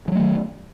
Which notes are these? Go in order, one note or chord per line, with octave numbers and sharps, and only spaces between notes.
D#3 F3 F#3 A3